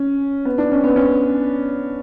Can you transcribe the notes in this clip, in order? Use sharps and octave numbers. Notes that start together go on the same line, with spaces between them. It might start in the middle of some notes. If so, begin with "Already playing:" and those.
Already playing: C#4
B3
D4
C#4
B3
C#4